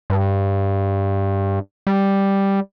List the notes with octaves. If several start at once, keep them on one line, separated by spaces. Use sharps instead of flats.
G2
G3